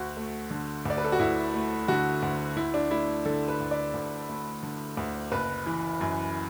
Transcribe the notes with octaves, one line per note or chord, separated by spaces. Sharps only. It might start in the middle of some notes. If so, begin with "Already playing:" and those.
Already playing: D2 F#4
A3
D3
D2 D5
B4
A4
F#4
D2 E4
A3
D3 F#4
D2
D2 E4
D4
A3 E4
D3 A4
B4
D2
D5
D2
A3
D3
D2
F#1 B4
E3
F#2